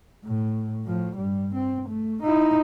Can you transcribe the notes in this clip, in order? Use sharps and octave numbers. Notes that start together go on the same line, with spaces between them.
A2
A2 F3
G2 G3
C4
A3
D#4 E4